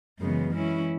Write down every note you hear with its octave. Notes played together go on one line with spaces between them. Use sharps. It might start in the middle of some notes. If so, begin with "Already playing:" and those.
F#2 C#3 E3 G#3 B3
E3 G#3 C#4 E4